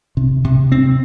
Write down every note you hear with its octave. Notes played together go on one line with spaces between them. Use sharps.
C3
C3
C4